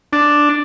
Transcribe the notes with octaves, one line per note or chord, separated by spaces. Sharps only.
D4